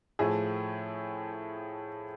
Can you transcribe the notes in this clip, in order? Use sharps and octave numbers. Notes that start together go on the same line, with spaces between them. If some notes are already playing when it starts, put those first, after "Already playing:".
A2 F3 A3 G#4